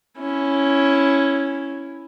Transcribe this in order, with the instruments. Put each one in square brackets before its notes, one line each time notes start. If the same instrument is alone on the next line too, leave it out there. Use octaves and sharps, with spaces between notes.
[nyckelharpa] C#4 E4